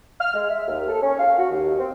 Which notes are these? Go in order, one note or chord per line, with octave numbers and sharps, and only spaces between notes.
F6
G#3
E5
D#2
A4
C#4
F5
F#4
D#2
C4